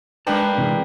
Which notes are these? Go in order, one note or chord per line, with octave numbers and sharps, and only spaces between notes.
G#3 A#3 D4 B4 G5 A5
C3 E3 G#3